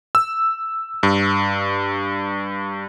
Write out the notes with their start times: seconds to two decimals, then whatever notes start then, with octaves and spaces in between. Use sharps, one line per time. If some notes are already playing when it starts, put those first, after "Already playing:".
0.15 E6
1.03 G2